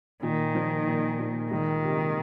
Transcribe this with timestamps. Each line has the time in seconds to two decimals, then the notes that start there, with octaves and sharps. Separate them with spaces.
0.23 A#2 D#3
0.55 F3
0.87 A#2
1.19 A#2
1.51 C#2 D#3
1.83 C3